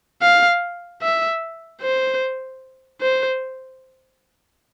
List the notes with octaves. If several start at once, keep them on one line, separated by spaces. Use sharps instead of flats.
F5
E5
C5
C5